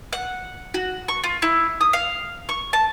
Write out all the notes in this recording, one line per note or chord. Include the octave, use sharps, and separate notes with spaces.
F#5
F#4
C#6
F4
E4
D#6
F5
C#6
A5